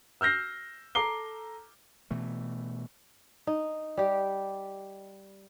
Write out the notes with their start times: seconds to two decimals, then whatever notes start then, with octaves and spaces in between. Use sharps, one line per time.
0.21 E6 F6 G6 A#6 C7
0.95 A4 A#5 D6 C7 G7
2.11 B2 E3 A3
3.47 D#4
3.97 G3 G4